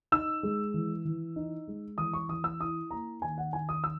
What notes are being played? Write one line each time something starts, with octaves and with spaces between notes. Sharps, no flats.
D#4 E6
G#3
E3
E3
D#4
G#3
E3 D#6
C#6
E3 D#6
E6
E4 D#6
A#3 A#5
D#3 G#5
F#5
D#3 G#5
D#6
E6